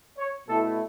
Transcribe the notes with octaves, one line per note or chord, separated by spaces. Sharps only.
C#5
B2 A3 E4 A4